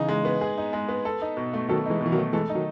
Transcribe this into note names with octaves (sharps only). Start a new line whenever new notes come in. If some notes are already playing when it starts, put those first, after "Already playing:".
Already playing: C#3 E3 D#4 G#4
G#3
B3
G#4
D#4
G#3
B3
A4
D#4
B2
A3
D#3 F#3 A4
E3 G#3 D#4
B2 E3
D#3 F#3
A3
E3 G#3 A4
D#4
D#3 F#3